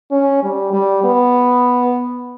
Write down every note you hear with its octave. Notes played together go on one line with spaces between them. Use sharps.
C#4
G3
G3
B3